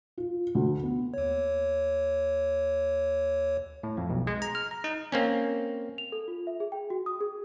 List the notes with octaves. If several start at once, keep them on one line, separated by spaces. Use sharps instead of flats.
F4
D2
B3
D#2 C#5
A2
F2
B1
G#3
A#5
F6
A#5
D#4
A#3 C4 C#4
F7
A4
F4
E5
G#4
G5
F#4
D#6
G#4